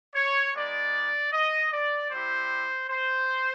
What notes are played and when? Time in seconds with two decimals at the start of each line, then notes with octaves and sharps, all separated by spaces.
0.15 C#5
0.55 G#3 B3 D#4 D5
1.32 D#5
1.72 D5
2.11 G3 C4 E4 G4 C5
2.90 C5